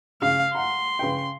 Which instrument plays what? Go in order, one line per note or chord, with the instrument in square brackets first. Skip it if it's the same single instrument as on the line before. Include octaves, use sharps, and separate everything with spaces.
[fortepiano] C#3 [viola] F5
[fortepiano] F#5 A#5 [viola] C6
[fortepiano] C#3 B4 G5